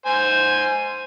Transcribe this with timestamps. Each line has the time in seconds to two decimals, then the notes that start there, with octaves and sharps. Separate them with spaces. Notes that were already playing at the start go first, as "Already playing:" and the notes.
0.06 C5 G#5